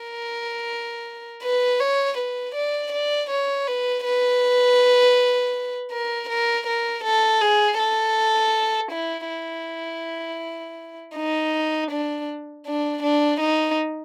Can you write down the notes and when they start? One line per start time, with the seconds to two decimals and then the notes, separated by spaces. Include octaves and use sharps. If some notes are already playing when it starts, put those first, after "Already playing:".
Already playing: A#4
1.43 B4
1.80 C#5
2.17 B4
2.55 D5
2.92 D5
3.30 C#5
3.67 B4
4.05 B4
5.92 A#4
6.29 A#4
6.67 A#4
7.04 A4
7.41 G#4
7.79 A4
8.91 E4
9.29 E4
11.16 D#4
11.92 D4
12.66 D4
13.03 D4
13.41 D#4